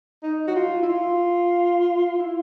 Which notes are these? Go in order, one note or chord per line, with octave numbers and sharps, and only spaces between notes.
D#4
F#4
F4
E4
F4
E4